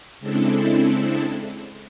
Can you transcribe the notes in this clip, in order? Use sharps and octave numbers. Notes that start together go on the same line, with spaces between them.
C#3 G#3 C4 D4 E4 A4